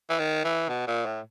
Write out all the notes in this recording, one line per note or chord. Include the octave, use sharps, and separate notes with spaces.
E3
D#3
E3
B2
A#2
A2